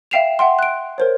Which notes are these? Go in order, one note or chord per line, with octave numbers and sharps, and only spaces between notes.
E5 F5 G5 C7 E7 F7
E5 F#5 G5 C6
F#6 D7
A#4 C5 C#5